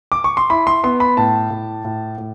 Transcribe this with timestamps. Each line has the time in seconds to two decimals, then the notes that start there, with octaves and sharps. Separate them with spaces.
0.12 D6
0.24 C#6
0.37 C6
0.50 E4 B5
0.67 C6
0.84 B3 C6
1.00 B5
1.17 A2 A5
1.50 A2
1.84 A2
2.18 A2